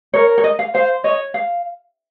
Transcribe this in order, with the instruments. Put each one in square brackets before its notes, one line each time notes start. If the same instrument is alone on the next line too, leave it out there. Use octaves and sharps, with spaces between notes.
[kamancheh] A#4 [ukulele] C#5
[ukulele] C#5
D#5
F5
[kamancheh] C5 [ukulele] F5
[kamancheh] C#5 [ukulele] D#5
[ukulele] F5